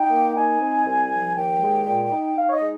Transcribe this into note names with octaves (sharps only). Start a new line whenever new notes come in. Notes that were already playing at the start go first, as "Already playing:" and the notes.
Already playing: D#4 G5
A#3
D#4 G#5
C4
C2
F3
D#2 G5
G#3
A#2
D#4
D#4 F5
C#5
D#5
G#3